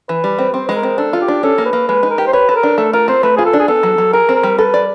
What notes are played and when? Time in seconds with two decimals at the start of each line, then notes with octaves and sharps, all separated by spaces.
0.09 E3 B4
0.24 G3
0.39 C4
0.53 C4 C5
0.68 G#3 B4
0.76 A#4
0.83 C4
0.98 D4 A4
1.13 F4
1.21 G4
1.28 D4
1.43 C#4 A4
1.58 A#3
1.66 B4
1.73 A#3
1.88 G#3 B4
2.03 D#4
2.11 A#4
2.18 G4
2.27 C5
2.33 B4 C#5
2.49 A4 B4
2.56 A#4
2.63 D4
2.78 A3 A4
2.93 F4 A#4
3.08 C4 C5
3.23 A3 B4
3.37 F4 G#4
3.46 A4
3.53 D4
3.60 G#4
3.68 B3 A4
3.83 F#3
3.98 F#3
4.13 G#4 A#4
4.29 C4
4.35 A#4
4.43 G3
4.58 A4 B4
4.74 D5